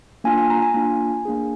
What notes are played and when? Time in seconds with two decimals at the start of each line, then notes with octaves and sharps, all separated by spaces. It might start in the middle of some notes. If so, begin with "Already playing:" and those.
0.24 A#3 D4 F4 G#5
0.38 G#5
0.50 A#5
0.62 G#5
0.74 A#3 D4 F4
1.25 A#3 D4 G#4